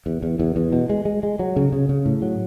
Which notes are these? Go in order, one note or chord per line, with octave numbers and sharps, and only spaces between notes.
E2
E2
E2
E2
B2
G#3
G#3
G#3
F#3
C#3
C#3
C#3
A2
F#3